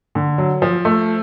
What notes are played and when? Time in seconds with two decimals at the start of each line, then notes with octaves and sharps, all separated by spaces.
0.15 D3
0.38 F#3
0.62 F3
0.85 A3